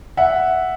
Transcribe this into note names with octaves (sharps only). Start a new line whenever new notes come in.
E5 F#5